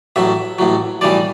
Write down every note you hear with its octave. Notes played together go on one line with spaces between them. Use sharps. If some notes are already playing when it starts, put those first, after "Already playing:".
A1 A2 F#3 E5
A1 A2 F#3
B1 A2 E3 G3 D5